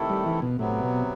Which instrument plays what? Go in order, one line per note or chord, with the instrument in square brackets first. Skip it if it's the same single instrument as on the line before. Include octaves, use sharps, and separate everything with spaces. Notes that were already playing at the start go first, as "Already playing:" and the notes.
Already playing: [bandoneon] C3 D#3 A3 E4 A4
[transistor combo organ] G3
E3
B2
[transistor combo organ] A2 [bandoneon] C3 F#3 B3
[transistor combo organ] B2